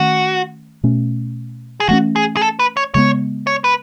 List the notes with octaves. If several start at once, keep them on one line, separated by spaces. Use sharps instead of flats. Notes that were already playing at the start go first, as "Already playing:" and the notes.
Already playing: D#3 A3 C#4 F#4
B2 A3 C#4
G#4
E3 A3 C#4 F#4
G#4
G#4
A4
B4
C#5
C#3 G#3 B3 C#5
C#5
B4